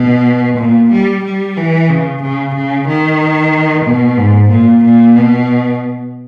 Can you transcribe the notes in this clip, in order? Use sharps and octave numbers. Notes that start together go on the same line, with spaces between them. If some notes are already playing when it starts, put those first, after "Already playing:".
Already playing: B2
A#2
G3
G3
E3
C#3
C#3
C#3
D#3
B2
G#2
A#2
A#2
B2